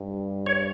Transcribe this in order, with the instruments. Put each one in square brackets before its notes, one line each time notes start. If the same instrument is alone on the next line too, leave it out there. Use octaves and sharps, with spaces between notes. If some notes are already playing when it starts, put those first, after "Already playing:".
Already playing: [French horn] G2
[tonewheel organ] C#5